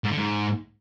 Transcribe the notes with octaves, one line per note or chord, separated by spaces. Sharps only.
G#2
D3
G#2